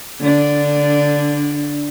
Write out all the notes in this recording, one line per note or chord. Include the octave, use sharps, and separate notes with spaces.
D3 D4